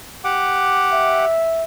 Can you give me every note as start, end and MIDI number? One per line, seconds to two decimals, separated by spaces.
0.24 1.25 67
0.24 1.25 78
0.24 1.25 86
0.93 1.64 76